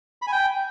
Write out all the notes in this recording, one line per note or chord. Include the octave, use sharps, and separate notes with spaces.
B5
G#5
G5